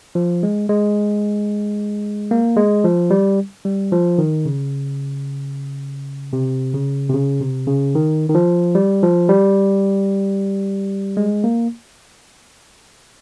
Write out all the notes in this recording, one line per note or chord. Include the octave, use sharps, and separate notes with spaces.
F3
G#3
G#3
A#3
G#3
F3
G3
G3
F3
D#3
C#3
C3
C#3
C3
C#3
C3
C#3
D#3
D#3
F3
G3
F3
G3
G#3
A#3